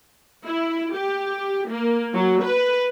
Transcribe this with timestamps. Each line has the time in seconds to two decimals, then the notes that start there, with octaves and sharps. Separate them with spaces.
0.46 E4
0.94 G4
1.68 A#3
2.13 F#3
2.42 B4